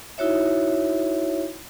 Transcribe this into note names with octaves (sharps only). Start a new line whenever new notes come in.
D#4 E4 F#4 C#5 E5